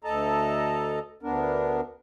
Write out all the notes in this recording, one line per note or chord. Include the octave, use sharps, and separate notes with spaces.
D2 A4 D#5 A5 A#5
D2 B3 D4 A#4